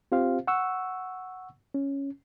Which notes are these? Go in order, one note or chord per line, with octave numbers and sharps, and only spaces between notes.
C4 F4 G4 C5 F5
F#5 C#6 E6
C#4